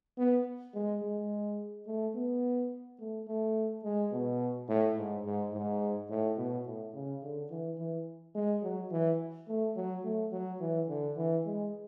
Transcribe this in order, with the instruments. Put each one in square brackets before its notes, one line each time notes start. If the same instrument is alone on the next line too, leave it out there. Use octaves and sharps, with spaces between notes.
[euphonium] B3
G#3
G#3
A3
B3
A3
A3
G#3
B2
A2
G#2
G#2
G#2
A2
B2
A2
C#3
D3
E3
E3
G#3
F#3
E3
A3
F#3
A3
F#3
E3
D3
E3
G#3